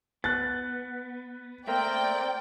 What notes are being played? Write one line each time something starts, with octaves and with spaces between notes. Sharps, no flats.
B3 F#6 A6
A3 A#3 C4 A#4 C5 D5 G5